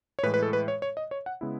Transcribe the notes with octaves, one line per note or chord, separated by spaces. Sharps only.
C#5
A2 E3 G#3 B4
B4
A4
B4
C#5
C#5
D#5
C#5
F#5
C#3 G#3 B3 E4